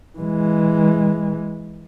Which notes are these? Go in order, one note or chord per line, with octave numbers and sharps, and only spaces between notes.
E3 G#3